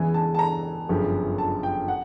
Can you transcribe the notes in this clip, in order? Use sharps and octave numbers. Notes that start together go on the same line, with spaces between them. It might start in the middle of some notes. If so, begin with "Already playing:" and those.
Already playing: E2 C#3 E3 G#3 G#5
A5
A5
A#5
G1 F#2 C#3 F3
A5
G5
F#5